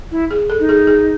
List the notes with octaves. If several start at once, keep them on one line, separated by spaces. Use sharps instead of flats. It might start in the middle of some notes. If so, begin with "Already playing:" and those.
E4
G#4
A4
D#4
G#4
G#4